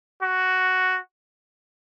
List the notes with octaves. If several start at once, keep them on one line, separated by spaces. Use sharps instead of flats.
F#4